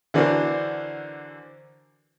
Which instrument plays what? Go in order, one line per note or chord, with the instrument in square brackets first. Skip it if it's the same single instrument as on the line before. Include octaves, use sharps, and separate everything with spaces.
[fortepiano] D3 E3 D4 F#4 A#4 C5